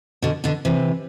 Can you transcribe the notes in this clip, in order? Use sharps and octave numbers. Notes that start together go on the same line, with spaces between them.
B2 D3
B2 D3
C3 E3